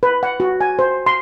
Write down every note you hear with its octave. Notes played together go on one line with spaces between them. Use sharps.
B4
F#5
F#4
G#5
C5
C6